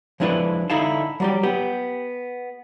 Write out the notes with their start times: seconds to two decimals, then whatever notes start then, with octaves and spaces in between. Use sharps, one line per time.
0.20 F3 G#3 D4 E4 B4
0.70 D3 D#4 E4 F5 A5
1.20 F#3 G3 G4
1.43 B3 G4